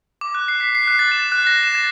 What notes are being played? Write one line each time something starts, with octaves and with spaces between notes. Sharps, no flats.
D6
F#6
C7
B6
C7
F#6
A6
E7
F#6
A#6
E7
A6